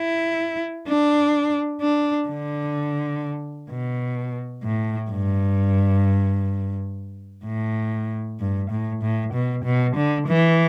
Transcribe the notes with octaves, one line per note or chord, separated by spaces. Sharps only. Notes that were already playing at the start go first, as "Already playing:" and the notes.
Already playing: E4
D4
D4
D3
B2
A2
G2
A2
G2
A2
A2
B2
B2
D3
E3